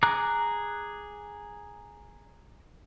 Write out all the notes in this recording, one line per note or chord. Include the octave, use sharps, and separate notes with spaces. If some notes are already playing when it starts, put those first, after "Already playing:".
G#4 A#5 D6 F#6